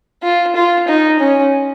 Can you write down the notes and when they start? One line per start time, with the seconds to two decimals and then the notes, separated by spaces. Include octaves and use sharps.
0.23 F4
0.55 F4
0.88 D#4
1.19 C#4